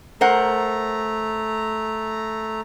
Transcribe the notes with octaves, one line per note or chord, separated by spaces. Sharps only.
A3 A#4 C5 F#5 A#5